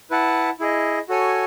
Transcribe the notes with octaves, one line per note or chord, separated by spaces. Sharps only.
E4 B4 F#5 A5
E4 G#4 D#5
F#4 A4 C#5 G#5